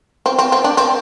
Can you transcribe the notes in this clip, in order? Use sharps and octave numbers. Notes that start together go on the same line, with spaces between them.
C4
C4
C4
D4
C4